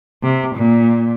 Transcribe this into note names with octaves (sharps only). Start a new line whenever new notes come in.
C3
A#2